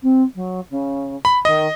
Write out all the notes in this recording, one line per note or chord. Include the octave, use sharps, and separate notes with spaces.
C4
F#3
C#3
B5
D#3 D#5